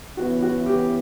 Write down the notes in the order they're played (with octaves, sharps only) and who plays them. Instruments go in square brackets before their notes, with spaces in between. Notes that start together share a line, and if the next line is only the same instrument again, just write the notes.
[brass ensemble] C#3 E3 B3 E4 [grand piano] F#4
[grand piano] F#4
G4